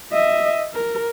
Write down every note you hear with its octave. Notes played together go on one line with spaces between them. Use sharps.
D#5 E5
A#4